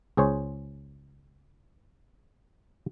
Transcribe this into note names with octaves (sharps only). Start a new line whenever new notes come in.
C#2 G#4 C5 C#5